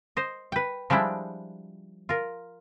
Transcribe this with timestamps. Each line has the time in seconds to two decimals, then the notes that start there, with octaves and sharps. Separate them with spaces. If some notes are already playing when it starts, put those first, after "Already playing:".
0.17 C5 D#5
0.52 B4 G5
0.90 F3 G3 G#3 D4 E4
2.09 F4 A#4